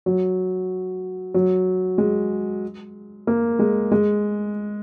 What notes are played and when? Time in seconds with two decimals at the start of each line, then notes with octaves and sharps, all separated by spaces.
0.06 F#3
1.34 F#3
1.98 G#3
3.27 A#3
3.59 G#3
3.92 G#3